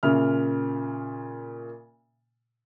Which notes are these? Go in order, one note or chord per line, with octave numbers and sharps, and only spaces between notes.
A#2 C#3 E5 F6